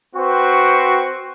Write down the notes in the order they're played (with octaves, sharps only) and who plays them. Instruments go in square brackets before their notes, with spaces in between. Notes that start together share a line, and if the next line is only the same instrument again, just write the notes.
[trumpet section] C4 F#4 B4 C5 G5 C#6